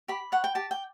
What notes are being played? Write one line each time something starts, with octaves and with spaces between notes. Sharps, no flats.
G4 B5
C#5 F#5
G5
G4 A5
G5